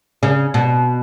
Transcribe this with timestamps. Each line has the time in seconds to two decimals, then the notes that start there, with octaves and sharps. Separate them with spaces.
0.23 C#3
0.54 B2